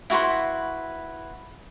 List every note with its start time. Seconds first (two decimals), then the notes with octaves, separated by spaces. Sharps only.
0.10 E4 F#4 B4 C6